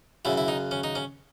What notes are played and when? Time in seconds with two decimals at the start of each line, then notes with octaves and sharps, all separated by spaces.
0.25 F#2 C#3 F#3 E4
0.38 E4
0.48 D#4
0.71 C#4
0.84 D#4
0.95 C#4